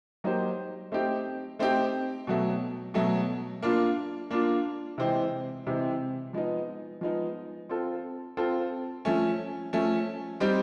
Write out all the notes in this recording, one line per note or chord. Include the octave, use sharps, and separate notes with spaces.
F#3 A#3 D#4 G4 C5
A3 C4 D#4 G4
A3 C4 D#4 G4
B2 F#3 A3
B2 F#3 A3
A#3 D4 F4
A#3 D4 F4
C3 E3 G#3 C4
C3 E3 G#3 C4
F3 G#3 B3 D#4
F3 G#3 B3 D#4
C4 F4 A4
C4 F4 A4
F3 A3 C#4
F3 A3 C#4
G3 C4 D#4 G4